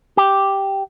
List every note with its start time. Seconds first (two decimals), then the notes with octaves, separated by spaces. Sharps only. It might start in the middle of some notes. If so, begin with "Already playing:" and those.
0.17 G4